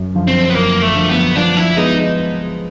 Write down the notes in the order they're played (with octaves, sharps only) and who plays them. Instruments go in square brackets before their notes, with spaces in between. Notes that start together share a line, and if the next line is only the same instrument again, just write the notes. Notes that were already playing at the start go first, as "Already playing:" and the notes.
Already playing: [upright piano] F#2
D3 F3
[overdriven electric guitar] C4
B3
[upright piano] F#2 [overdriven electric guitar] A#3
[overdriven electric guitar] A3
[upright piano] D3 F3
[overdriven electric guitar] B3
[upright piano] F3 [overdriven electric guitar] D4
[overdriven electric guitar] E4
[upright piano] G#3 B3 [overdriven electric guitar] D#4